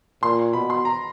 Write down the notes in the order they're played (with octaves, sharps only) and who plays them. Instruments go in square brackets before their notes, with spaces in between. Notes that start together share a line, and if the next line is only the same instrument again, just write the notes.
[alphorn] A#2 [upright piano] C6
[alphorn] B2 [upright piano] B5
[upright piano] C6
A#5